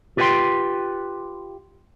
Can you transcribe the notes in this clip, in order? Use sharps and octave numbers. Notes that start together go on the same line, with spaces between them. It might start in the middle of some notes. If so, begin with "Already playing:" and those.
F4 G4 B4 D5 G5 C6